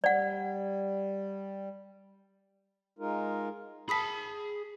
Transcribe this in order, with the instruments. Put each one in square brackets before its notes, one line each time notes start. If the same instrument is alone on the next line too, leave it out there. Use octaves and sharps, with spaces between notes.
[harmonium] G3 [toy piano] D5 F#5
[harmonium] G#3 D#4 F4 A#4
[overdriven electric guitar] G#4 A5 [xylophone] B5 D#6 B6